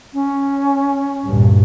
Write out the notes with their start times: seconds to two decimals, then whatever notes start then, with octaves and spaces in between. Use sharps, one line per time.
0.13 C#4
1.25 D2 G2 A#2